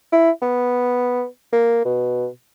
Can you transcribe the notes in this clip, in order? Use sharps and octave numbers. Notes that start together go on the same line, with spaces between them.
E4
B3
A#3
B2